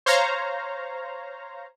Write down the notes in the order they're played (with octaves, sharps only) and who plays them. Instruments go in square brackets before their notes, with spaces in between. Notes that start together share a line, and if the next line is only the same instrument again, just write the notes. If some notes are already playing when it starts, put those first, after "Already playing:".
[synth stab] C5 C#5 F5 A#5